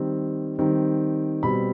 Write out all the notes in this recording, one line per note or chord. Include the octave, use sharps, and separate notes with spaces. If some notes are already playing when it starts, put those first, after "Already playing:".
Already playing: D#3 G3 C4
D#3 G3 C4
B2 G3 C4 B5